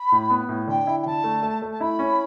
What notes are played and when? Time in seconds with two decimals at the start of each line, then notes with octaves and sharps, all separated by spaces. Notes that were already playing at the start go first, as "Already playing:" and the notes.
Already playing: B5
0.12 A2
0.30 B3
0.49 A2
0.67 D3 G5
0.87 E4
1.02 G5
1.06 D3 A5
1.24 A3
1.42 A3
1.62 A3
1.71 A5
1.80 E4 B5
1.99 C#4